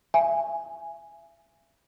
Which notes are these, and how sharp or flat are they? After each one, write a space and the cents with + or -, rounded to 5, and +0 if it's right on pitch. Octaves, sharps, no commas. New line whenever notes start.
E5 +35 G#5 +0